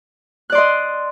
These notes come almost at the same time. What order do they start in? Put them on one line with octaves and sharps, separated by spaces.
F#6 D5 C6 D#5